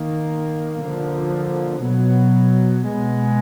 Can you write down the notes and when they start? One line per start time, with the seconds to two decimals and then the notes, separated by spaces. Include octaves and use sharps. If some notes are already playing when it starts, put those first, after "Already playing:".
Already playing: D#3 A#3
0.79 D3 F3 A#3
1.82 B2 F#3 B3
2.86 B2 G#3 B3